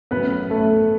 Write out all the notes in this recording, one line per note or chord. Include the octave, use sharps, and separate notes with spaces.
A1 A2 F#3 B3 B4
A3 A4